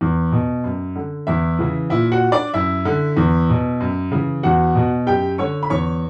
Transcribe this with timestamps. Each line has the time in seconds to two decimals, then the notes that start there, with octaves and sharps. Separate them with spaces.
0.01 E2
0.32 B2
0.64 F#2
0.96 D3
1.27 E2 E4 E5
1.59 C#3 E3
1.90 A#2 E4 E5
2.12 F#4 F#5
2.32 D4 D5
2.54 F#2 E4 E5
2.85 D3
3.17 E2
3.49 B2
3.80 F#2
4.12 C#3 E3
4.43 E2 F#4 F#5
4.75 B2
5.07 F#2 G4 G5
5.38 D3 C#5 C#6
5.63 B5
5.70 E2 C#5 C#6